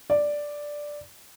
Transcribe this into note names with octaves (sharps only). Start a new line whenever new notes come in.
D5